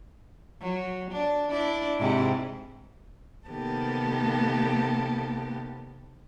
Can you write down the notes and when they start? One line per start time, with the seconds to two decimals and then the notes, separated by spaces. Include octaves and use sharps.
0.61 F#3
1.11 D4
1.50 D4 E4 D5
2.00 G#2 C3 E4
3.48 C3 D#3 A#3 B3 G4 A4